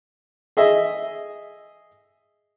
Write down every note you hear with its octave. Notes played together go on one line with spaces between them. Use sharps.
G#4 D#5 E5